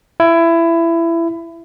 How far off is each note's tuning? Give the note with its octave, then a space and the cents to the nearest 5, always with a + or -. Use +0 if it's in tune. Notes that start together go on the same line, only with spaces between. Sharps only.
E4 +20